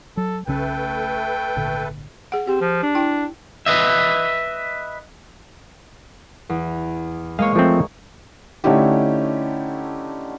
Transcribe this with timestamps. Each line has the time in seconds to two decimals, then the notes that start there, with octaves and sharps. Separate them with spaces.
0.17 F#3 A4
0.47 B1 C#3 A3 C#4 A4 B4 G5
1.56 G#1 A#2 D3
2.32 G#4 F#5
2.47 C4 G4
2.61 F3
2.83 D4
2.95 E4 G5
3.66 B4 D#5 E5
6.49 E2
7.39 G#3 A#3 C#5 F5
7.56 F3 A3 C4
8.64 D3 A3 C#4 D#4 E4 G4